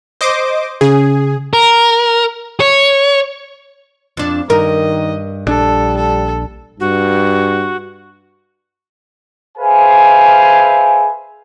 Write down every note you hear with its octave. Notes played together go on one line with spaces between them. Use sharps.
C5 D#5 D6
C#3 G#4
A#4
C#5
F2 D4
G2 D#3 A#4 D#5
A#1 G3 D4 A4
A4
G2 F#4
G#4 B4 C5 E5 F5 G#5